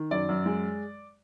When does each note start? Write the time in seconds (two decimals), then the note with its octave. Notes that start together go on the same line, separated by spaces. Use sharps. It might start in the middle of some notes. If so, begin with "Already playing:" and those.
Already playing: D#3
0.11 F#2 D5
0.29 F#2
0.46 G#3